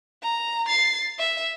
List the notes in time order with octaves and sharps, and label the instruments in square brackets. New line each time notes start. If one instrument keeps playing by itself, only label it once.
[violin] A#5
A6 C7
E5